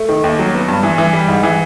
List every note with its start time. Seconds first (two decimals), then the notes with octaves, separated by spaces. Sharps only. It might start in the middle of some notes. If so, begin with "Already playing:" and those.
Already playing: A3
0.09 D#3
0.24 D#2
0.39 F#3
0.54 B3
0.68 G2
0.83 E3
0.98 E3
1.13 G3
1.28 G#2
1.43 E3